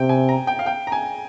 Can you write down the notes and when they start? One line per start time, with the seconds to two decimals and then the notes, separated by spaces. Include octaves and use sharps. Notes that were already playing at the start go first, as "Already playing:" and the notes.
Already playing: C3 G5
0.09 G#5
0.29 A#5
0.47 G5
0.59 F5
0.66 G5
0.87 A#5
0.92 G#5